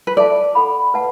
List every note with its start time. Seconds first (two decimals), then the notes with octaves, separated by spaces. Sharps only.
0.07 B4
0.17 A4 D5 E5 A5
0.55 A4 F#5 B5
0.94 B4 F#5 A5